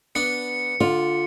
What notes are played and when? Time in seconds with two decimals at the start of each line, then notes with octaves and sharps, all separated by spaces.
0.15 B3 D4 C#7
0.81 D3 F4